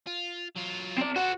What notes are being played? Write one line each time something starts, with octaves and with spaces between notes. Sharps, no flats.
F4
F#3 F4
C4 D5
F#4 A4 C5